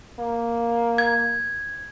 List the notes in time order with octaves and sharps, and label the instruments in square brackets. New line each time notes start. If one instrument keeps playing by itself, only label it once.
[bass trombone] A#3
[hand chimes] G#6